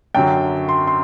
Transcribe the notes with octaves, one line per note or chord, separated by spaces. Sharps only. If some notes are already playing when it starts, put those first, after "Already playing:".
F#2 D3 F#3 G5
C6
C6